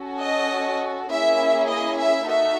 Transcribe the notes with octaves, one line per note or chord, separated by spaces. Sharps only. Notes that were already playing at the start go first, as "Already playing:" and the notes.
Already playing: C#4 F#4 A4
D#5
A#3 C#4 E4 G#4 E5
D#5
E5
D#4 F#4 A4 E5